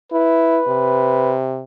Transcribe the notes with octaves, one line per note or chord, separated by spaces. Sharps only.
E4 B4
C3